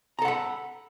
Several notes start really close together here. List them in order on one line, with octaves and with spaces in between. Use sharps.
A#5 A4 F#5 B5